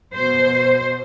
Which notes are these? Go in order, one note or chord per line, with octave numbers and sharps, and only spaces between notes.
B2 C5